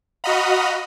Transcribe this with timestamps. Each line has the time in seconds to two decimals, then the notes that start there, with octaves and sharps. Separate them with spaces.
0.24 F#4 D#5 F5 F#5 A#5 B5